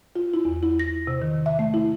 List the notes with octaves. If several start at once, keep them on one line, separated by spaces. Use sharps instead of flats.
F4
E4
E2
E4
A#6
C3
D#3
E5
A3
E4